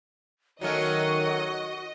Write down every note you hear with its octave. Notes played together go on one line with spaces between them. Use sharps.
D#3 F#3 A3 C#4 F#4 D#5